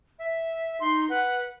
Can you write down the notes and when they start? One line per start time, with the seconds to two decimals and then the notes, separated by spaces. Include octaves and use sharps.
0.19 E5
0.80 D#4 C6
1.09 B4 F#5